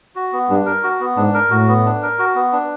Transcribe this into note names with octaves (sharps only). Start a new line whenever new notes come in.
F#4
B3
G2 D4
A#4
F#4
B3
G#2 D4
A#4
A2 F#4
B3
D4
A#4
F#4
B3
D4